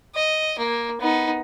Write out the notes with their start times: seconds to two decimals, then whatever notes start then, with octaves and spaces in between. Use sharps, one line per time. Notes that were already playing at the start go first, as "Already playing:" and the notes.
0.15 D#5
0.59 A#3
1.01 B3 D#4